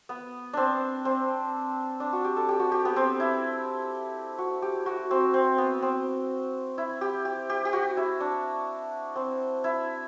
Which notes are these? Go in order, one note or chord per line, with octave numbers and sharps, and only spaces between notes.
B3
C4 D4
C4
D4
F#4
G4
A4
G4
F#4
G4
B3
C4
E4
F#4
G4
F#4
C4
C4
B3
C4
E4
G4
G4
G4
G4
F#4
E4
D4
C4
E4